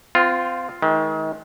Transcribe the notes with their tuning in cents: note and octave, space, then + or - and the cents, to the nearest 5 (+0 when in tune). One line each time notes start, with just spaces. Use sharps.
C4 -25 F4 +0
D#3 +35 G#3 +40